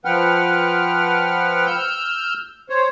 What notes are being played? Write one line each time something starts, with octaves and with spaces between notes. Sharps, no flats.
F3 B4 F#5 G5 F6
E6 F6 G6
C5 C#5